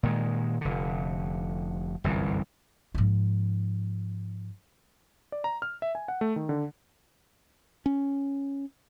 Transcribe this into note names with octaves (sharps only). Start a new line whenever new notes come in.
A#2 D#3 G#3
F1 D3
G1 C2 F#2 E3
G#2 F3
D5
A#5
F6
E5
G#5
F#5
A3
D#3
D3
C#4